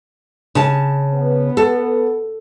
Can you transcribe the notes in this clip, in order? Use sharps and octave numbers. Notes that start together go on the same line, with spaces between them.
C#3 A5
B3
A4